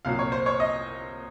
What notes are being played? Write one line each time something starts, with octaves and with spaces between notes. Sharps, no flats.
C2 A#2 F#3 F5
C#5
C5
C#5
D#5